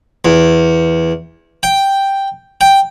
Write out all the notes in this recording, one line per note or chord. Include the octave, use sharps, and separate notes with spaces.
E2
G5
G5